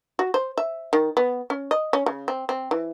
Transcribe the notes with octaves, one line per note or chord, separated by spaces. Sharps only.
F#4
C5
E5
D#3
B3
C#4
D#5
C#4
C#3
C4
C4
E3